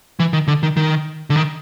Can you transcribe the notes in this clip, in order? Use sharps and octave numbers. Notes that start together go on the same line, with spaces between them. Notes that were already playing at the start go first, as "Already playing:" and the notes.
E3
D#3
D3
D#3
D#3
D3
D#3